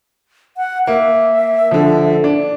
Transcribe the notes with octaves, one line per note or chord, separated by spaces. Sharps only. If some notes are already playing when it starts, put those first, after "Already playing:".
F#5
A#3 E5
D3 F3
D4